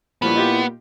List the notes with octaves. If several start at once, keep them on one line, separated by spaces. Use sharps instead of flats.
A#2 F3 G3 B3 E4 C#5
D#4 F4 G4